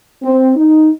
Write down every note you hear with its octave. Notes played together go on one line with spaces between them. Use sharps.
C4
D#4